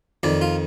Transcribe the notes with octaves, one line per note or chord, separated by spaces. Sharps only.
F2 D#3 D5
F4